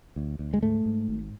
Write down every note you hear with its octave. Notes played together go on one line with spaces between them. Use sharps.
D2
D2
G#3
G#2 A3
G#2
G#1